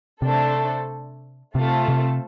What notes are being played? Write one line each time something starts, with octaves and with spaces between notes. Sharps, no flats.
C3 A3 D4 A4 C5
C3 A3 C4 F4 A4
C3